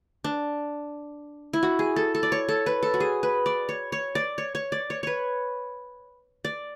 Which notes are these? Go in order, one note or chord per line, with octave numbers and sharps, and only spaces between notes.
D4
E4
F#4
G#4
A4
A4
D5
C#5
A4
B4
A4
F#4
G#4
B4
D5
C#5
C#5
D5
C#5
C#5
D5
C#5
B4 C#5
D5